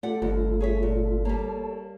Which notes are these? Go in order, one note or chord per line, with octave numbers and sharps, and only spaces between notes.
A3 F4 G4 A4 D5 F#5
G1 D#2
G#4 C#5 E5
A#2
G3 A#3 A4 C#5 A5